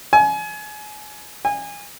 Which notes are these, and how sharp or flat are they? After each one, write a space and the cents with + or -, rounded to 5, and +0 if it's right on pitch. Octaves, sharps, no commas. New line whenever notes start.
G#5 +30
G#5 -25